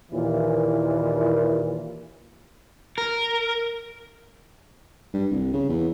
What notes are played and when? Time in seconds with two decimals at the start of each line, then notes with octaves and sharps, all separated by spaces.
0.12 D#2 A#2 E3
2.98 A#4
5.14 G2
5.31 C2
5.53 C#3
5.69 E2